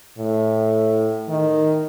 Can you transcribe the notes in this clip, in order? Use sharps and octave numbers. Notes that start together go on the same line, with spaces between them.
A2
D#3